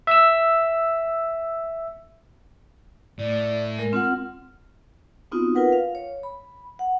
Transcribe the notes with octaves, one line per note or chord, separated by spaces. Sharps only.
E5 E6
A2 D5
G#3 A#4
C4 F4 F#5 F6
B3 C4 D#4 F4 F#4
F4 A#4 B4 F#5
F5
C#5
B5
F#5